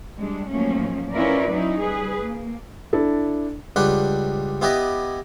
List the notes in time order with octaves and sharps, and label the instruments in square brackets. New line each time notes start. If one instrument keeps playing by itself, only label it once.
[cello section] G3 G#3 D4
G#2 F3 F#3 A3 A#3 C#4
C#4 E4 F4 A#4 B4 D5
F#3 C#4 D#4 E4
G3 G#4 B4
A#3
[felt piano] D4 E4 A4
[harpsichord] C#2 G3 D4 B4 F#5 G5
B3 E4 G4 B4 D5 D#5